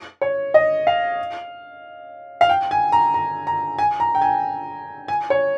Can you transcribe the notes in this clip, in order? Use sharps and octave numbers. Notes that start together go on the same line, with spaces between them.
C#5
D#5
F5
F5
G5
G#5
A#5
A#5
A#5
G#5
A#5
G5
G#5
G#5
C#5